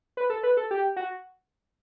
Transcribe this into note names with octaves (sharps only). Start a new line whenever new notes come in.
B4
A4
B4
A4
G4
F#4